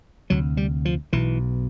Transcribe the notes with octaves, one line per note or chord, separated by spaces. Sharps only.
D2 C3 F#3
G3
F3
B1 B2 E3